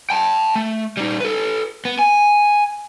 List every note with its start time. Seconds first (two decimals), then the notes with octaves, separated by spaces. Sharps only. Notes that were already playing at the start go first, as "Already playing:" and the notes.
0.10 G5 A5
0.56 A3
0.97 G3 D#4
1.20 A4 B4
1.85 B3
1.99 G#5